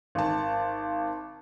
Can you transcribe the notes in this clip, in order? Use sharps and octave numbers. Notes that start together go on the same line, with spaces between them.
G#1 A5